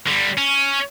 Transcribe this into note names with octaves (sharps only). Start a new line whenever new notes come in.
D3 G3
C#4